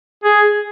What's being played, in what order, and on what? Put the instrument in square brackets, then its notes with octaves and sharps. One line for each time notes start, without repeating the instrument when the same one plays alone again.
[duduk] G#4